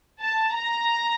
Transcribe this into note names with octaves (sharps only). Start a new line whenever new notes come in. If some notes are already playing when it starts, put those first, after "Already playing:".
A5
A#5